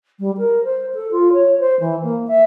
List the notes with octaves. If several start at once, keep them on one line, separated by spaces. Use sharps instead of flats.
G3
A#4
C5
A4
F4
C#5
C5
E3
A#3
E5